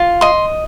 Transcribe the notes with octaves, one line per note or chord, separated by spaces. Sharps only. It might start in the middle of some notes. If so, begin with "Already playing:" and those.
Already playing: F4
D#5 C6